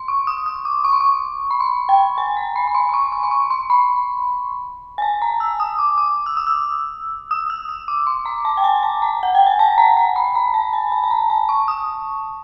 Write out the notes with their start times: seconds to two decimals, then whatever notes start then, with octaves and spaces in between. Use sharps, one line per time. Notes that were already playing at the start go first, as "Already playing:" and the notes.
Already playing: C6
0.08 C#6
0.27 D#6
0.46 D#6
0.65 D6
0.84 C#6
0.92 C6
1.01 C#6
1.51 B5
1.60 C6
1.89 G5
2.18 G#5
2.37 A#5
2.56 B5
2.67 B5
2.75 C6
2.89 C6
2.94 C#6
3.12 C#6
3.23 C6
3.31 C#6
3.50 C6
3.70 B5
4.98 G#5
5.02 A5
5.22 A#5
5.40 E6
5.60 D#6
5.79 D6
5.98 D6
6.26 E6
6.37 D#6
6.47 E6
7.31 D#6
7.50 E6
7.69 D#6
7.88 D6
8.07 C6
8.25 A#5
8.45 A5
8.57 G5
8.64 G#5
8.83 A5
9.02 A#5
9.23 F#5
9.35 G5
9.46 G#5
9.59 A5
9.78 A#5
9.97 A#5
10.16 B5
10.35 A#5
10.54 A5
10.73 G#5
10.92 A5
11.04 A5
11.11 A#5
11.30 A5
11.49 C#6
11.68 D#6